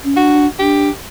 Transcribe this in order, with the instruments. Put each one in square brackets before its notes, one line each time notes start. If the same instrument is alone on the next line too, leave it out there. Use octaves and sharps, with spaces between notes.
[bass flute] C#4
[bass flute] D4 [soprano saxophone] F#4
[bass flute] D4 [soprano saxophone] G4